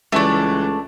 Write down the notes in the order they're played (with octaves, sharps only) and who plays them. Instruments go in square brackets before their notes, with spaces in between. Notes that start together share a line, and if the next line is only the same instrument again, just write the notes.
[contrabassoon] C#2 [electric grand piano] E3 G3 [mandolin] A3 D4 [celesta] E5 C#6